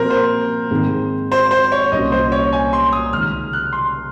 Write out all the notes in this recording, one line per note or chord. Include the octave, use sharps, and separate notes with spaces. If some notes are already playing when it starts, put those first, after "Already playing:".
Already playing: A#2 F3 C4 F#4 A#4 C5
C5
G#2 D#3 G#3 C4
C5
C5
C#5
C2 A#2 F#3 C#4 F#4 D#5
C5
C#5
G#5
C6
D#6
C#2 C3 D#3 F6
F#6
C6